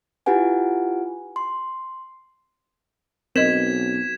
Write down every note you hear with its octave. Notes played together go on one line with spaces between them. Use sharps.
E4 F4 G4 B4 F#5 G#5
C6
B1 C4 A#4 D#5 G#6 B6 E7